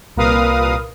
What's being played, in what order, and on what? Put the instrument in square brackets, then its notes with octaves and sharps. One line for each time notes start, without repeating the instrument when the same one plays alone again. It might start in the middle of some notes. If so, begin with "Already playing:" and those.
[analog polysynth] C2 A#2 A#4 B4 F5 D#6